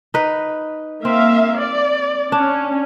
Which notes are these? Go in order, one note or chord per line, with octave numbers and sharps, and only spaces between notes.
D#4 B4
A#3 C4 E5 F5
D5
C#4 D4